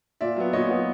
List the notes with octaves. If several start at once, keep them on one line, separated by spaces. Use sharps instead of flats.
A#2 D5 E5
F#3 B3
A#2 C#5 D#5
F#3 B3